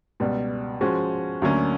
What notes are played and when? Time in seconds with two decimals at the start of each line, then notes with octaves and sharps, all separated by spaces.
0.20 C#2 B2 G3
0.81 F3 G#3 C#4 F#4
1.42 D2 D3 F#3 A#3 C#4